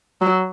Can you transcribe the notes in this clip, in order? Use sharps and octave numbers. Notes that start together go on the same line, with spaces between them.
F#3